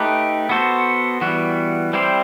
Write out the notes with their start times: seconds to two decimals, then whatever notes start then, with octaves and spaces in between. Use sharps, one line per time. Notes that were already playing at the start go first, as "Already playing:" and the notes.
Already playing: A3 D#4 G4 B4
0.49 B3 F#4 A4 C5
1.21 E3 G3 B3 F#4
1.93 G3 C4 E4 G4 C5